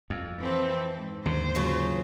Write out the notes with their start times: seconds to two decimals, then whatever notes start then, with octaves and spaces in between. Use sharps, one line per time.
0.10 F2
0.40 E3 C4 A4
0.93 G#2
1.26 D#2 D3 C5
1.55 C#3 F#3 F4